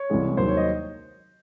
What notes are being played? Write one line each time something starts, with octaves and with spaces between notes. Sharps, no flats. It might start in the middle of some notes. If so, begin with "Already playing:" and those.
Already playing: C#5
C2 C3 E3 G#3
D#2 D#3 F#3 C5
C#5
D#5